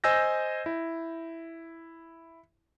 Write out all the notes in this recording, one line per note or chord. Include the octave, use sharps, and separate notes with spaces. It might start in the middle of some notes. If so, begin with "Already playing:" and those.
C5 D#5 G#5 E6 G6 A#6
E4